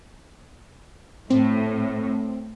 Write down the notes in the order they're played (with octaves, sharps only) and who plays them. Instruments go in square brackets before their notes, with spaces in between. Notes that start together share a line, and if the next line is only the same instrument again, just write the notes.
[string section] A2 [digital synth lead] C4